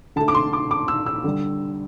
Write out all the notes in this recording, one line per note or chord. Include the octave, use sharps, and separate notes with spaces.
D3 A3 A5
D6
C6
D6
D6
E6
E6
D3 G3